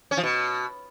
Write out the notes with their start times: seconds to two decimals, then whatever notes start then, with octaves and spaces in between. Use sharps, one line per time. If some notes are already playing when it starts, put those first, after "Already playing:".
0.11 C#4
0.17 F3
0.23 B2